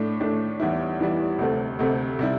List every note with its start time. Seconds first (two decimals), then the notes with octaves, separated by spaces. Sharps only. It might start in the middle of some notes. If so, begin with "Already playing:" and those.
Already playing: A2 A3 D4
0.20 A2 A3 D4
0.60 E2 E3 G3 E4
1.00 E2 E3 G3 E4
1.39 D2 C3 A3 C4
1.79 D2 C3 A3 C4
2.19 C3 G3 E4